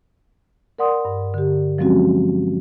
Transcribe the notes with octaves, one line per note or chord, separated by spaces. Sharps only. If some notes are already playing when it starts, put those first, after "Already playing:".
A#4 D5 F#5 C6 D#6
G2
D3 G4
F3 F#3 G#3 C4 C#4 F#4